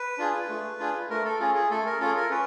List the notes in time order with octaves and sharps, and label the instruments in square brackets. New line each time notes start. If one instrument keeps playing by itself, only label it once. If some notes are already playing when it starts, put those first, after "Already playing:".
Already playing: [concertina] B4
D4 F4 G#4
A3
D4 F4 G#4
A3 A#4
A4
C#4 F4 G#4
G#4
A3 A4
A#4
C#4 F4 G#4 A4
A#4
C#4 B4